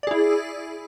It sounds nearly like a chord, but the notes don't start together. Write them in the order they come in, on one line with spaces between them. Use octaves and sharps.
D5 G#4 E4